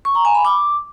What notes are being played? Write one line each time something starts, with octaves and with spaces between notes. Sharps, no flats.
C#6
A#5
G#5
B5
D6